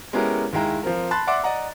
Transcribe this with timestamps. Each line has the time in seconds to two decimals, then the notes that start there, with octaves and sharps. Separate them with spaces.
0.13 G#3 B3 C#4 E4 G4 A#4
0.53 D#2 D#3 G#3 E4 G5 A#5
0.83 F3 C4 A#4
1.11 A5 B5 C6 F#6 A6
1.27 D5 E5 F#5 C6 D6 F#6
1.44 D5 D#5 F#5 A#5